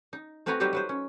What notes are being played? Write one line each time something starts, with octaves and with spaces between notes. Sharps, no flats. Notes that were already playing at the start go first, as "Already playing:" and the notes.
D#4
A3 C4 F#4 B4 G#5 A#5
F#3 G3 D#4 G4 B4 C5
F#3 B4 C5
C#4